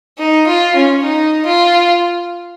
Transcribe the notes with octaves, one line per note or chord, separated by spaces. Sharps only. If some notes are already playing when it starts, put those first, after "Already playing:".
D#4
F4
C#4
D#4
F4